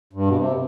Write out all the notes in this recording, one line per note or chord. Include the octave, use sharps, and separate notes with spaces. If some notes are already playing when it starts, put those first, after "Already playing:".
G2
B2
C3